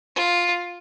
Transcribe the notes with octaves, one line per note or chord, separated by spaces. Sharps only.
F4